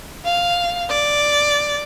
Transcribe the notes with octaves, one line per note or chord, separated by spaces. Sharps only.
F5
D5